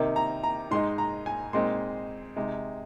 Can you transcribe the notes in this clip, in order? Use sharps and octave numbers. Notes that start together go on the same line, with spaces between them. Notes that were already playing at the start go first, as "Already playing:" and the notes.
Already playing: C3 D#3 A#3 D#4
A#5
A#5
G#2 G#3 D#4 C6
A#5
G#5
A#2 G#3 C4 D#4 C6
C3 G#3 D#4